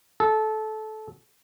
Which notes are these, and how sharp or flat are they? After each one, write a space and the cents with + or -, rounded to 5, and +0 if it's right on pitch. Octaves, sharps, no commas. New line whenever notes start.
A4 -20